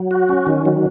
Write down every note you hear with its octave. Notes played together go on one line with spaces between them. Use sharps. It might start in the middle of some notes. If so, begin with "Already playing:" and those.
Already playing: F#3
F#4
C#4
D#3
F#3